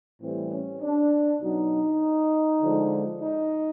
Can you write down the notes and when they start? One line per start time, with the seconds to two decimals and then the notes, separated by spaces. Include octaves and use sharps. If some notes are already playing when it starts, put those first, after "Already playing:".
0.22 A2 E3 G3 C4
0.52 C#4
0.82 D4
1.42 B2 F#3 D#4
2.62 D3 F3 G#3
3.22 D#4